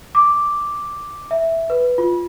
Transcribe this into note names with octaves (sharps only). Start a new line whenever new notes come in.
D6
E5
B4
F4